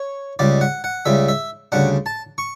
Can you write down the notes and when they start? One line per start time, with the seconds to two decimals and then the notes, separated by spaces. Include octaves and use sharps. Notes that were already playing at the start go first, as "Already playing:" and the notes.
Already playing: C#5
0.39 C#2 C#3 G3 D5
0.61 F#5
0.84 F#5
1.05 C#2 C#3 G3 E5
1.28 E5
1.72 D2 C#3 G3 D4 F#5
2.06 A5
2.38 C#6